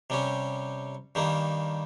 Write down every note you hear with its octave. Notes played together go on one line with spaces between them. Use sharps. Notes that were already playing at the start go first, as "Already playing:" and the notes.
C3 G3 C#4
G2 D#3 G3 A#3